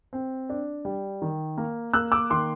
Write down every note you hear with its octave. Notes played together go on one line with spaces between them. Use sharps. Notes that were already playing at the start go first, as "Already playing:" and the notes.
C4
D4
G3
D#3
A#3
A#3 E6 F#6
D6 E6
D#3 C6 D6